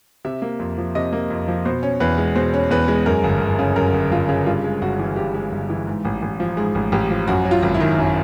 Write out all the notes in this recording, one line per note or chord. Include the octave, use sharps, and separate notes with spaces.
C3 E5
A#3
F2
F3
C3 D#5
A#3
F2
F3
B2 C5
C#4
E2 B4
G#3
B2 C5
C#4
E2 B4
G#3
F#2 A#4
G1
G1
C#3
F#2 A#4
G1
G1 F4
C#3
G2 F4
G#3
G1 F#4
E3
G2 G4
G#3
G1
E3
G#2
A1
A1
F3
G#2 G#4
A1
A1 G4
F3
F#2 F#4
F#3
F4
G#1
E4
D#3
F#2